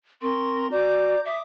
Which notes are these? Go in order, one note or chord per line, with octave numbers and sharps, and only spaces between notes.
C4 A#4 C6 C#6
F#4 D5 A#5 D6 G6
E5 D6 D#6